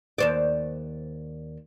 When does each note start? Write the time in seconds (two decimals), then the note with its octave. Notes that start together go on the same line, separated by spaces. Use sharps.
0.18 D#2 C5 D5